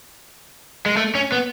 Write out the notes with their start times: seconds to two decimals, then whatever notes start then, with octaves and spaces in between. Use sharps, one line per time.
0.86 G#3
0.97 A3
1.15 C#4
1.32 B3